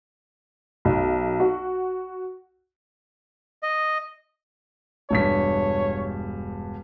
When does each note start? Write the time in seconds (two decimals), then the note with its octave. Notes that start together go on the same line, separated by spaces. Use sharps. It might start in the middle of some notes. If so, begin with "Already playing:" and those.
0.85 B1
1.40 F#4
3.63 D#5
5.10 E1 G2 C#5 B6